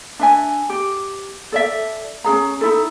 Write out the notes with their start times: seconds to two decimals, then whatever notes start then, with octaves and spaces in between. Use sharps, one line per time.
0.19 D4 E5 G#5
0.69 G4
1.52 A4 D5 E5
2.24 C#4 D4 G#4 A#5
2.61 D#4 E4 A4